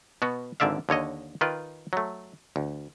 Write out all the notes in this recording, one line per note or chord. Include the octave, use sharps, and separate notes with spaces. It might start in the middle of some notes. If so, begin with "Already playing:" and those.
B2 B3 F#4
G#1 G#2 D3 D5 E5 F5
D#2 D3 C#5 D#5
D#3 F4 B4 G5
F#3 A3
D2